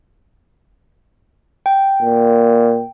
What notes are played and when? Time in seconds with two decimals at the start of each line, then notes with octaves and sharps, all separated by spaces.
1.66 G5
2.02 A#2